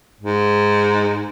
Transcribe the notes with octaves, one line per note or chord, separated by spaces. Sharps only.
G#2